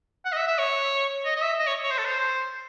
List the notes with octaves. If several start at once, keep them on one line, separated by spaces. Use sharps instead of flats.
F#5
D#5
E5
E5
C#5
D#5
D#5
E5
D#5
C#5
C#5
C5
A4
C5